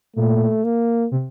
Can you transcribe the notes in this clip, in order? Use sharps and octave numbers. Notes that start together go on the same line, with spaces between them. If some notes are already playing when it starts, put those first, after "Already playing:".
A#2 A3
A#3
C3